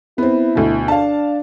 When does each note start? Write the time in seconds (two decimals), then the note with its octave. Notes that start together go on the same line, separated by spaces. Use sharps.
0.18 B3 C4 E4
0.55 D2 B2
0.88 D4 F5 A5